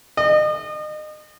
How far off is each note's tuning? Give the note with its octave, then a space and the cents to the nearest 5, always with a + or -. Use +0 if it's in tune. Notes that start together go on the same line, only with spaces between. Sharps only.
D#5 -35